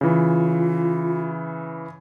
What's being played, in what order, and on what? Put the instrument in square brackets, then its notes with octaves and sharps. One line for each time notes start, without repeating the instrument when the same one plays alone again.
[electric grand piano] C#3 E3 [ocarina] F4